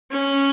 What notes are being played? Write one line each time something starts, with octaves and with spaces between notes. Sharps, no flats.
C#4